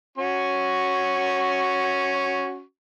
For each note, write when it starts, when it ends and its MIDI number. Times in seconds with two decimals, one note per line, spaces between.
0.18 2.61 61
0.18 2.61 66
0.18 2.61 85